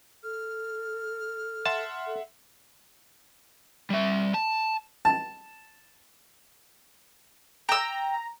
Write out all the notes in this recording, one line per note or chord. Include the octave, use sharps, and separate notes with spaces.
A4 F6
E5 F#5 A5 C6
A4
G3 E5
A5
A5
G5 A#5 E6